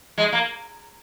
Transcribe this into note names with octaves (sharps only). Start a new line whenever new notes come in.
G#3
A#3